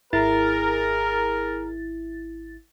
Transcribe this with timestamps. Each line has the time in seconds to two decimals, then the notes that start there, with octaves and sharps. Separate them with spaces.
0.13 G#1 E4 G#4 A#4 A6